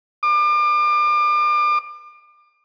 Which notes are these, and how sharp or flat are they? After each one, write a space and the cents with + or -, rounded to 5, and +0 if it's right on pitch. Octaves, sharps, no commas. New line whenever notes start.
D6 +35